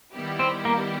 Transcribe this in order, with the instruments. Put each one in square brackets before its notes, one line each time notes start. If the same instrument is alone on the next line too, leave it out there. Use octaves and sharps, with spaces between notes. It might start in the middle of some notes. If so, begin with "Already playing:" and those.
[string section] D#3 G3 B3 E4 G4
[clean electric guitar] C4
A#3